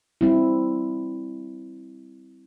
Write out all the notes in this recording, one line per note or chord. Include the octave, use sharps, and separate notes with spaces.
G3 C4 E4